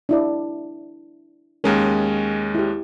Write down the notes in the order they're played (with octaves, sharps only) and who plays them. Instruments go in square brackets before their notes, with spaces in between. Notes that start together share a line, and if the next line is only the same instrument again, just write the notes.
[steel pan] D4 E4 D5
[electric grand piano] D#2 G#3 C#4 [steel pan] A#4
[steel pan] E4 G4